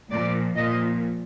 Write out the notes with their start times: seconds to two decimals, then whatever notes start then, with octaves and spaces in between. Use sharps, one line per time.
0.12 A#2 F3 D5
0.56 A#2 F3 D#5